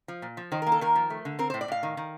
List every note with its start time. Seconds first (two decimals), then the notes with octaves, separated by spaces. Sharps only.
0.08 F3
0.22 A#2
0.37 F3
0.52 D#3 C5
0.62 A#4
0.67 A#3
0.72 A4
0.81 D#3 A#4
0.95 F3
1.10 A3
1.25 D3
1.39 C4 A#4
1.50 A2 C5
1.61 D5
1.68 A2 F5
1.83 D#3
1.97 D#3